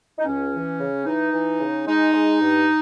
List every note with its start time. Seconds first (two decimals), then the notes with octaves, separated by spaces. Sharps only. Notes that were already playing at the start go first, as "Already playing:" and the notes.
0.19 D#4
0.25 C#2 C#4
0.53 E3
0.79 C#3
1.06 E3 D#4
1.33 E3
1.60 C#3
1.87 G#3 D#4
2.14 G#3
2.41 G2